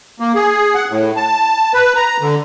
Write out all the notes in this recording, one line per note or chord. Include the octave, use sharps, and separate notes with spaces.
A#3
G#4
F#5
A2
A5
B4
A#5
D3